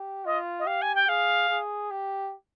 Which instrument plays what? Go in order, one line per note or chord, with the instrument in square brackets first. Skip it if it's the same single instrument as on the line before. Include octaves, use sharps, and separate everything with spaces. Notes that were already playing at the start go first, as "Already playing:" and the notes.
Already playing: [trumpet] G4
[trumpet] F4 [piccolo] D#5
[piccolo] D#5
[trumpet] G4 [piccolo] F5
[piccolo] G#5
G5
[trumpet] G#4 [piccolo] F5
[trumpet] G#4
G4